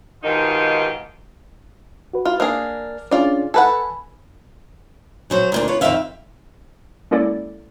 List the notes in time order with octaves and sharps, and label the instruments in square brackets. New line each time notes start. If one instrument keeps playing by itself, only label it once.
[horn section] G#2 B2 D#3 D#4 F4 G4
[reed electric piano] F#4 B4
[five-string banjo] F4
[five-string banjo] A#3 D4 G#4 [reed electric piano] F6
[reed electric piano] C#4 D4 G#4 [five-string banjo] F4 D5
[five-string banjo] A4 B4 F#5 [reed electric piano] G#5 B5
[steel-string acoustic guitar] C#3 F#3 C5
D2 A#2 D4
F4 B4 C#5
F2 C3 D#3 C4 E5 F5
[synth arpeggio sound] G#3 A#3 C#4 E4 A4 D5